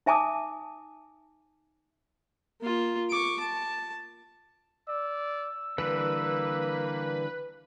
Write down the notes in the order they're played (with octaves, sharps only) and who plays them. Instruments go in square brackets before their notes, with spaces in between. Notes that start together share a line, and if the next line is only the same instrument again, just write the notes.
[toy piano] D#4 E5 G#5 A5 D6 D#6
[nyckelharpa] A#3 F4
C#6 D6
A5
[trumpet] D5 [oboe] E6
[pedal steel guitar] D3 E3 G3 [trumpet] A#3 [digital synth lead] B4